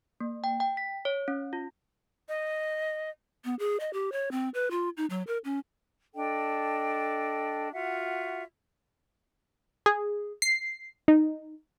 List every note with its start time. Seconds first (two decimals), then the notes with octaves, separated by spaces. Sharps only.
0.20 A#3
0.44 G5
0.60 G5
0.77 B6
1.05 C#5
1.28 C#4
1.53 F4
2.29 D#5
3.45 B3
3.59 G#4
3.80 D#5
3.93 G4
4.12 C#5
4.31 C4
4.54 B4
4.71 F4
4.97 D#4
5.10 F#3
5.27 A#4
5.45 C#4
6.14 D4 A4 D#5 G5
7.74 F4 F#4 E5 F#5
9.86 G#4
10.42 C7
11.08 D#4